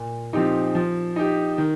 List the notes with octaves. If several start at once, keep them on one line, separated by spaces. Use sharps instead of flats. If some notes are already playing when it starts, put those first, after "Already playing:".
Already playing: A#2
F3 C4 D#4 G4
F3
D#4 G4
D#3